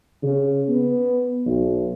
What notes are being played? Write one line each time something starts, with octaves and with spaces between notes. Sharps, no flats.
C#3
B3
B1